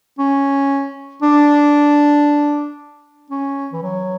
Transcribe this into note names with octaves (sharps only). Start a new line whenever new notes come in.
C#4
D4
C#4
E3
F#3